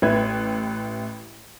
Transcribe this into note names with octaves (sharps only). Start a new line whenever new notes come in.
A1 B4 E5 G#6